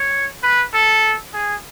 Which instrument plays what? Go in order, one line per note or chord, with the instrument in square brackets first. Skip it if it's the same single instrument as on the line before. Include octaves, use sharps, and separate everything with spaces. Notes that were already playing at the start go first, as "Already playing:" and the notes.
Already playing: [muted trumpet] C#5
B4
A4
G#4